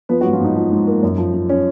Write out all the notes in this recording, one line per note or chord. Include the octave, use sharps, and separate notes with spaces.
F3 B3 B4
F#3 F#4
G#2
F3 F4
G#2 D#4
F3
G#2
A#3
F#2
F3
F3
C#4